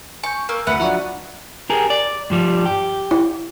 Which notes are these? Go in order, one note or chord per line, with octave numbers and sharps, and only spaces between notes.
G#5 C#6 G6
A#3 A#5 E6
D2 B4 E5 F#5 C#7
F3 F#3 D4 E5 A#5 C#6
G4 G#4 A#4
D5
G2 F3 G3
G4
E4